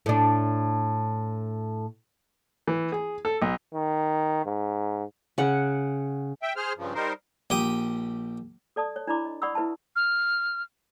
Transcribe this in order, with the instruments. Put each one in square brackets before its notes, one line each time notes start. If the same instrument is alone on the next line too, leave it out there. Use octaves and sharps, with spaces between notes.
[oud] A2 D4
[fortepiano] E3
G#4
A4
B1
[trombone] D#3
G#2
[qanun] C#3 F#5
[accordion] E5 G5
G#4 C5 F6
G2 C#3 F3
G3 D#4 A#4 C5
[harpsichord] A#1 G4 G5 D#6
[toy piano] A4 D5 A5 D#6
C#5
D4 E4 D5 A#5 B5 D6
D#5
D5 F#5 B5 C#6 D#6 E6
E4 B4 E5 A5
[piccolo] F6